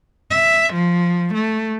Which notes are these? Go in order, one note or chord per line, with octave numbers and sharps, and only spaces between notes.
E5
F3
A3